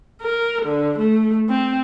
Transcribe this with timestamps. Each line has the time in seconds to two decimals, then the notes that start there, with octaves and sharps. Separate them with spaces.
0.21 A#4
0.66 D3
0.98 A3
1.49 C4